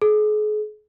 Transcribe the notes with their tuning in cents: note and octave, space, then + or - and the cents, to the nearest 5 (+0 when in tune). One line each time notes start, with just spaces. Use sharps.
G#4 +40